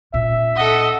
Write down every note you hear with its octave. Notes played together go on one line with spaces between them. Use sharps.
A#2 C#4 E5
A4 D#5 F#5